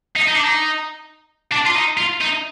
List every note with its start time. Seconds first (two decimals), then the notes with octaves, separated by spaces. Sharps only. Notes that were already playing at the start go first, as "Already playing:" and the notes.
0.16 D#4
0.28 D#4
0.35 D4
0.43 D#4
1.52 D4
1.65 F4
1.75 D#4
1.97 F4
2.21 D#4